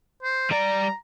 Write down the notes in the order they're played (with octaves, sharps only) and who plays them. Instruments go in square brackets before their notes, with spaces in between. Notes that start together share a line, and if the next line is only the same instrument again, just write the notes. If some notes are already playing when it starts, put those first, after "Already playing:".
[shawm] C5
[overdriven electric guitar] G3 D5 [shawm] A#5